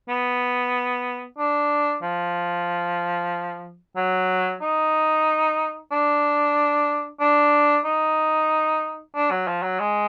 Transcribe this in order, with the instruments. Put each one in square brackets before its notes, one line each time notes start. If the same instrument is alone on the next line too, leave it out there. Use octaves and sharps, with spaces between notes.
[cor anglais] B3
D4
F3
F#3
D#4
D4
D4
D#4
D4
F#3
F3
F#3
G#3